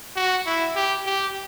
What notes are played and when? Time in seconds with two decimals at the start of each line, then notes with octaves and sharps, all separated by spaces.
0.16 F#4
0.46 E4
0.76 G4
1.06 G4